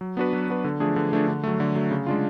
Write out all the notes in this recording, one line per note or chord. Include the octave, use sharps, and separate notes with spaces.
F#3
B3 D4 F#4 B4
F#3
B3 D4 F#4 B4
D3
F3 A3 D4 G#4
D3
F3 A3 D4 G#4
D3
F#3 A3
D3
F#3 A3
C#3
G#3 D4 F4